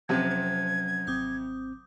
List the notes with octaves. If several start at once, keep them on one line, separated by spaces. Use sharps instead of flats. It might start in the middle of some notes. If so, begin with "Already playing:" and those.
F2 C3 F#3 C#4 C5 F#5 G#6
G#1 C4 D6 D#6 G6